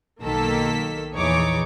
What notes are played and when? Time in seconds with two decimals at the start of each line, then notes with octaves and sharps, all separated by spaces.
0.22 B1 D#3 A#3 A4 E6 B6
1.14 A#1 E2 E3 D#4 C#5 D6